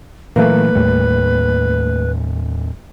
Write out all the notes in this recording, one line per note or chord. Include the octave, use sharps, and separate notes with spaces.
A#2 E3 F#3 A3 A#3 B4
D#2 A2 G3